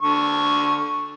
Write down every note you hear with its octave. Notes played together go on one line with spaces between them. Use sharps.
D3 C#6